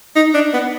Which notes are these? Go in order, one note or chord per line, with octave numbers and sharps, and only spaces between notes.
D#4
D4
B3